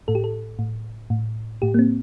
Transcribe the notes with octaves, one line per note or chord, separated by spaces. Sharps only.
A2 A4
G4
A4
A2
A2
A2 G4
A#3
C4